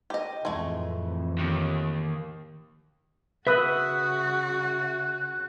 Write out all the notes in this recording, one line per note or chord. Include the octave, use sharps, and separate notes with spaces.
G4 D#5
F2 A2 E3 G#3 A3
D#2
C#3 F#4 B4 E5 D#6 E6 F#6